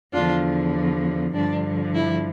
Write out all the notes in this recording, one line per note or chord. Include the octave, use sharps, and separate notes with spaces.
E2 D3 F3 D4 F4
G2 D3 F3 D4
E4